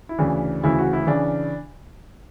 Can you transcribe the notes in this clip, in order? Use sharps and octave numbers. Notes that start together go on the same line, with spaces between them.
E4
D2 C#3 E3 D4
D2 C#3 E3 E4
F#4
E4
C#3 E3 D4